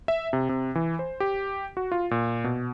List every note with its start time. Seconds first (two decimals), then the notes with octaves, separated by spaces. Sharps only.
0.08 E5
0.33 C3
0.49 C3
0.75 E3
0.99 C5
1.20 G4
1.77 F#4
1.92 F4
2.11 A#2
2.44 B2